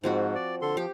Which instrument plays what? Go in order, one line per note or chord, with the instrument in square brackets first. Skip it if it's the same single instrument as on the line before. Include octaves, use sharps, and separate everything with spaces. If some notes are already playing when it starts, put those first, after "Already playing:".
[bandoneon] G#2 [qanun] F3 C4 F#4
[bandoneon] D5
D3 A4 C6
[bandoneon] F3 [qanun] G4